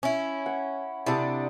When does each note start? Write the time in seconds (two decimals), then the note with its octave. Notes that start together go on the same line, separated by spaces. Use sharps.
0.03 C#4 E4
0.46 F#5
1.06 C3 D4 E4 A4 D#6